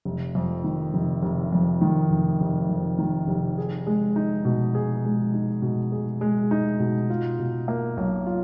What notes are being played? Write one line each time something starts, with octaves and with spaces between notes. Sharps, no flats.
F1
F2
D#3
F1
F1
F2
D#3
F1
F1
F2
D#3
F1
G#4
G#3
D#4
B2
G#4
G#3
D#4
B2
G#4
G#3
D#4
B2
F4
B2
A#3
B1
F4